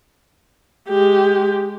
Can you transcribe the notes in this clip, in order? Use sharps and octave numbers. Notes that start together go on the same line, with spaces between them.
G#3 G4